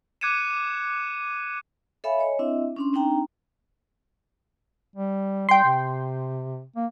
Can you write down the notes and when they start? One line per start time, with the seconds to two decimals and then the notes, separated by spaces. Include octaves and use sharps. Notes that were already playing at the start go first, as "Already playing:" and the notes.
0.21 D6 F#6 G#6 C#7 D#7 E7
2.04 A4 C#5 E5 F5 G#5 B5
2.18 C#5 D#5 G#5
2.39 C4 D4 E4 D#5 E5
2.76 C#4 D4 C6
2.93 C4 D4 D#4 G5 A#5
4.96 G3
5.49 G3 G5 C6
5.64 C3
6.76 A#3